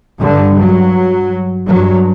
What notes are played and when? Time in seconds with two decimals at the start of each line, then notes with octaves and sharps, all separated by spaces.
0.20 G2 D3
0.57 F#3
1.67 G2 F#3